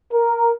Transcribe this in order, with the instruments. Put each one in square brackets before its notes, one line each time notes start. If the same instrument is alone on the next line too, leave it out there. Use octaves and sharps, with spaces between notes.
[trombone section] A#4